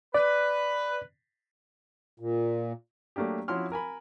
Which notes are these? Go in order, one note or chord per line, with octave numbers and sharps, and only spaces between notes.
B4 D5
A#2
F#3 A3 A#3 D4 G4
F3 C#4 E4 F#4 C6 F6
A#4 G#5 B5